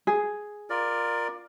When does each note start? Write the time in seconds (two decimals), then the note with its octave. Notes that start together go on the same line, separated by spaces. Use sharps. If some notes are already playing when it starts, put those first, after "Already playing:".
0.07 G#4
0.70 F4 A#4 D5